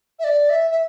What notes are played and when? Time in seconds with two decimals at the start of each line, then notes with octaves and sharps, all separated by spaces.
0.19 E5
0.24 D5
0.50 E5
0.71 E5